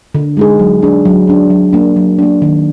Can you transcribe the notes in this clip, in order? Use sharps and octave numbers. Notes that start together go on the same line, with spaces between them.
D3
G#3 D#4 G#4
F#3
D4 G#4
F#3
D4 G#4
F#3
A#3 D4
F#3
A#3 D4
D#3